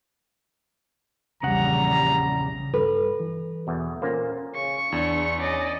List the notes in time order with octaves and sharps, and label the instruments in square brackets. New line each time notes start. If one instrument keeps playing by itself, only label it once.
[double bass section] A#1 E2 G3 [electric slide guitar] C#3 F#5 [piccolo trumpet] A#5
[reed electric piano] G2 [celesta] A4 [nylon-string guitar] B4
[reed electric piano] E3
[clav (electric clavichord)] E2 B2
[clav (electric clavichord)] A#2 A#3 [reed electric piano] C#4 C5
[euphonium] C#3 [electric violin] C#6
[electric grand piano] E2 [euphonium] D4
[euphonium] C#4 [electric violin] D5 D#5